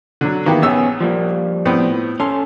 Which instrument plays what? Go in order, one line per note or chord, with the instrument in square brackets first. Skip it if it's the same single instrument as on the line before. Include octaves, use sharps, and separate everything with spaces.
[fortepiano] D3 F#3
[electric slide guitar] D#3 E3 [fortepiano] A#3 B3 G4
[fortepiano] A#1 C#5 E6 [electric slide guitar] B3 C#4 G#4
[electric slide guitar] F3 G3 A#3
[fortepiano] A2 B3 C4
[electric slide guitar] C#4 A4 [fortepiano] C6